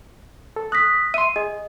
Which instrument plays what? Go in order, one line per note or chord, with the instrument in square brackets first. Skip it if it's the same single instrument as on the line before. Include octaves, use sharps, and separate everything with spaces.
[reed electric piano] A4
[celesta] D#6 A#6 B6 [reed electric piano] F#6
[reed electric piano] E5 C6 [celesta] D#7
[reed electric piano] G#4 [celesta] D#5